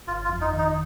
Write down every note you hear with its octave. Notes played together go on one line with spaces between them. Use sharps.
G1 F4
F4
F2
D#4
D#3 D#4